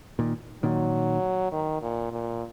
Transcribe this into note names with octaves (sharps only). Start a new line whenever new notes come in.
A#2 D#3
A#2 D#3 F#3
D#3
A#2
A#2